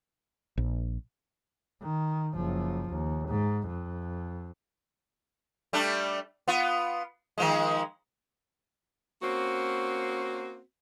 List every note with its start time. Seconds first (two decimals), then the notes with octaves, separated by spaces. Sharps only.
0.57 A#1
1.82 D#3
2.35 F#1 F3
2.89 D#2
3.28 G#2
3.67 F2
5.73 G3 A3 D4
6.48 B3 F4
7.38 D#3 F3 G#3
9.23 A#3 C4 C#4 F#4